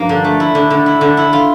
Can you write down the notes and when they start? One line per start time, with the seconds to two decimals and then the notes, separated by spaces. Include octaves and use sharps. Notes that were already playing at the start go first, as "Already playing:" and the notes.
Already playing: G2 F3 A#3 D4
0.09 D3
0.24 A3
0.40 E4
0.55 D3
0.70 D3
0.86 E4
1.01 D3
1.17 E4
1.33 F4